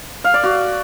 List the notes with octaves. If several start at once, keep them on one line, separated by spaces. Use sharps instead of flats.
F5
D5
F#4